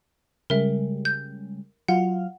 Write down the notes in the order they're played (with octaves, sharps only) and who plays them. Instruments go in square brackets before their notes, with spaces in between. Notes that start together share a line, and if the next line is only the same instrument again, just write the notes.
[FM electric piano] C#3 G3 G#3 [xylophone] A#4 E5
[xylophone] G6
[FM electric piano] F#3 F4 F5 [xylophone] F#5